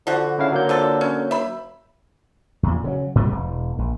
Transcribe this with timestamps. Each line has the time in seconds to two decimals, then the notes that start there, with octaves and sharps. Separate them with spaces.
0.07 D3 F3 F#4
0.39 C#3 E4 F5
0.52 F#3 A#3 G6
0.69 C3 F4 A4
1.01 C#4
1.31 E5 B5
2.63 E2 A#2
2.84 C#3 F#3
3.15 G#2 C3 G3 G#3
3.32 E1
3.78 A#1